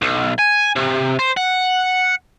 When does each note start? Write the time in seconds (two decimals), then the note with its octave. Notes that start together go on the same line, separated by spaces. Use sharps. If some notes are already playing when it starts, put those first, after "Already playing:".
0.02 B1
0.39 G#5
0.76 C3
1.19 C5
1.37 F#5